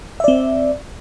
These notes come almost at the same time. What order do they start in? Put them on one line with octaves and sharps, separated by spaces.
E5 D5 C4